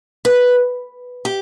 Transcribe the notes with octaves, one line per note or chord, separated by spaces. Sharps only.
B4
G4